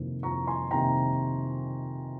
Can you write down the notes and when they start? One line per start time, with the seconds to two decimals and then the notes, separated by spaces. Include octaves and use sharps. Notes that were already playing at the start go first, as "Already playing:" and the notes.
Already playing: F2 C3 D#3 A#3
0.23 F2 A#5 C#6
0.47 G#5 C6
0.71 C3 D#3 A#3 G5 A#5